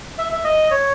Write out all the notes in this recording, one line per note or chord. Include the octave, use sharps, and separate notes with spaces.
E5
E5
D#5
C#5